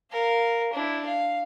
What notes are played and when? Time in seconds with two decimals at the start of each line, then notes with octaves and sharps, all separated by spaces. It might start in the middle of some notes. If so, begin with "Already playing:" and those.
0.12 A#4 F5
0.73 D4 E4
1.06 F5